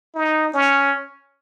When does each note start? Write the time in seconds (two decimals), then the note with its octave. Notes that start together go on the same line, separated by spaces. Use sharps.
0.15 D#4
0.53 C#4